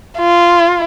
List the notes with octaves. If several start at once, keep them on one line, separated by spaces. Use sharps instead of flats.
F4